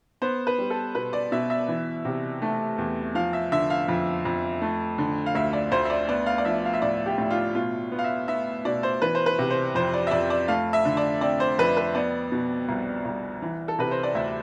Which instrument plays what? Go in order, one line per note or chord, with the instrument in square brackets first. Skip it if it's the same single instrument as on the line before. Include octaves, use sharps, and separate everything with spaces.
[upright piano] B3 C5
B4
G3
A4
B2 B4
D5
B2 E5
E5
E3
C3
A3
E2
F3 F5
E5
D3 E5
F5
F2
F2
A3
D3
F5
D2 E5
D5
D2 C5
E5
D5
B3 D5
F5
D5
F3 E5
F5
E5
A2 D5
G4
A2
F4
B2 F4
B3
F5
E5
B3 E5
B2 D5
C5
E3 B4
C5
B4
C3
C5
F2 C5
D5
E5
F2 D5
D5
A3 F5
E5
D3
D5
C4 D5
C5
F2 B4
B4
B3 D5
B2
C2
C2
E3
A4
C3 B4
C5
D5
D2 E5